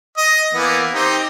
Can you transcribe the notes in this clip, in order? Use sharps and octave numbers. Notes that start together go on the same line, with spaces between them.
D#5
E3 A#3 B3
C4 D#4 G4